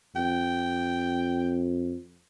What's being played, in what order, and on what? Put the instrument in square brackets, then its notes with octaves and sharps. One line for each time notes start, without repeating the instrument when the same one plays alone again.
[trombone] F2 [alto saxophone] G5